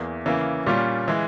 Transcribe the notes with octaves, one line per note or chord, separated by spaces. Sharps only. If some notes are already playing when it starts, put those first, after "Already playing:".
Already playing: E2 E3 A#3
C#3 E3 A#3
A#2 G3 C#4 F4
E3 G#3